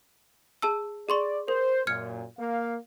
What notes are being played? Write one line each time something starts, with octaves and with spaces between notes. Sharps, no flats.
G#4 A5 E6
G#4 D5 C6 C#6
A#4 C5
F#2 A#2 F6 G#6 C#7
A#3 F5